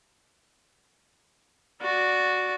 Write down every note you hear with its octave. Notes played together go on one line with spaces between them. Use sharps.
F#4 D5